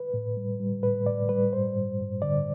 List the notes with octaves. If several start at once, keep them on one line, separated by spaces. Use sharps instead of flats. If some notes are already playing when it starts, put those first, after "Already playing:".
Already playing: B4
A2
G3
G3
A2 B4
A2 D5
G3 B4
G2 C5
G2
G2
D3 D5